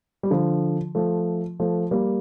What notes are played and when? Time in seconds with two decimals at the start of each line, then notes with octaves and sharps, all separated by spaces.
0.23 G3
0.30 D3 F3
0.95 F3 A3
1.60 F3 A3
1.91 G3 A#3